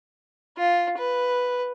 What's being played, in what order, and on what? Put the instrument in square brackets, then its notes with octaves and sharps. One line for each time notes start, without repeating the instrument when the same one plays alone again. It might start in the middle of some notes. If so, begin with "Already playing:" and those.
[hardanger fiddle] F4
B4